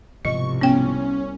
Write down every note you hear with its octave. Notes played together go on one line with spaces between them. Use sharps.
C2 G#2 B2 F3 D#5 C#6
B3 C#4 G5